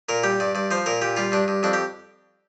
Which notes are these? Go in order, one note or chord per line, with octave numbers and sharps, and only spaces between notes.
A#2 A#4
G3 G4
G2 D5
G2 D5
F3 C5
A#2 A#4
A#2 G4
G3 F4
G2 D4
G2
F2 D4
G4